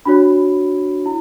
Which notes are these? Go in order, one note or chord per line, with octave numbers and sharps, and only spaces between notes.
D4 F#4 C#5 B5
E4